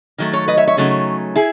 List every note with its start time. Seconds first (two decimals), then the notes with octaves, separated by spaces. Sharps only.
0.18 D#3 F#3 A3
0.33 A4 C#5
0.48 B4 D#5
0.57 C#5 E5
0.68 C#5 E5
0.77 C#3 F#3 A3 D#4
1.36 E4 G#4